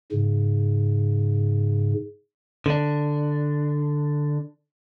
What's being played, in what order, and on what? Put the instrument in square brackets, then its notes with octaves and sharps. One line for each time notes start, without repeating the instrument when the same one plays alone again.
[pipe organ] G#2 C#3
[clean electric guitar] D3 D4